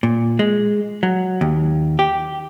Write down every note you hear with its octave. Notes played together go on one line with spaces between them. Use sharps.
A#2
G#3
F#3
D#2
G4